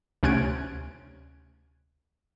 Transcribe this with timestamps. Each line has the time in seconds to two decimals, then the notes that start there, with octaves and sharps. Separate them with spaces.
0.23 D2 C3 C#4 F#6 G#6 D7